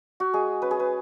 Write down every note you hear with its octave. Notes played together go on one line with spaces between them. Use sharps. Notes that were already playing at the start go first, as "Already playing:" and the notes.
F#4
G#3 G#4
C#4 B4
G#4
B4